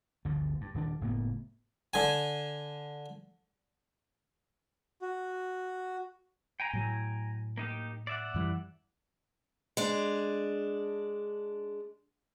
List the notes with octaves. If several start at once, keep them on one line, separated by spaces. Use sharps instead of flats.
G1 D2 B2 D3
G2
D#1 D#3 D4
F#1 A2 A#3 B3
D3 G#5
F#4
G5 G#5 A#5
A2 F#3
A#3 D#4 G4
D5 E5 F#5
F#2 E3 G3
G#3 D4